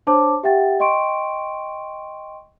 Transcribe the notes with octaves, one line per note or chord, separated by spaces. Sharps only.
D4 C5 C#5 A5 D6
G4 E5 F#5 G5 A6
D#5 G5 C6 C#6 D7